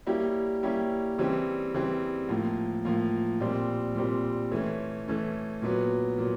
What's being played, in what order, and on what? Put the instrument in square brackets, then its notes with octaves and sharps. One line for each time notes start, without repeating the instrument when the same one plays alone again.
[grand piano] G3 A#3 C#4 E4 G4
G3 A#3 C#4 E4 G4
C#3 E3 G3 C4
C#3 E3 G3 C4
A2 F3 A#3
A2 F3 A#3
A#2 G3 C4
A#2 G3 C4
E3 A3 C#4
E3 A3 C#4
A#2 F#3 B3
A#2 F#3